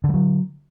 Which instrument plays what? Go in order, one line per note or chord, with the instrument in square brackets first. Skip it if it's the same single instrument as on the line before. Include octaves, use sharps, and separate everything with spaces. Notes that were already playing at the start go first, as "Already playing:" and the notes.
[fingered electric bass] D3
G3
F#3